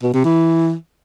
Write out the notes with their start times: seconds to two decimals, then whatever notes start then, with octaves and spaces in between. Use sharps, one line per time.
0.03 B2
0.14 C3
0.25 E3